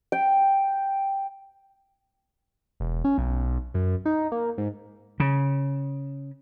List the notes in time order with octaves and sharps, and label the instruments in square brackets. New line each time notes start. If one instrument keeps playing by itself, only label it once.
[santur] G5
[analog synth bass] E1
C#4
B1
F#2
D#4
A#3
G#2
[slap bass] C#3